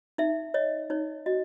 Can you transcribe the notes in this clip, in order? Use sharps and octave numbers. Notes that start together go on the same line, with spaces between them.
D#4 E5
C#5 D#5
D#4 C#5
F#4 D#5